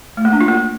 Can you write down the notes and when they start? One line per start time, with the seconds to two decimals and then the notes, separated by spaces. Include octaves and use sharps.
0.17 A3
0.25 A#3
0.33 D4
0.41 F4
0.48 A#3